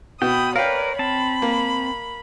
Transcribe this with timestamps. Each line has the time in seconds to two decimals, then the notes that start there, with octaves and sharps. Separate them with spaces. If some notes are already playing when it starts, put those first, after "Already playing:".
0.22 B2 G5 B5 D#6
0.56 A#4 B4 C#5 D5 F5 G5
0.99 C4 A5 B5
1.42 A#3